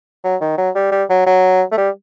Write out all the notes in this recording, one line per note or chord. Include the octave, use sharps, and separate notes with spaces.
F#3
D#3
F#3
G3
G3
F#3
F#3
A3
G3